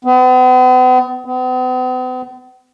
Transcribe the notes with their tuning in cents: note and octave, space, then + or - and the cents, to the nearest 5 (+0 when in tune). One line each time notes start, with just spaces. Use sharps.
B3 +45
B3 +45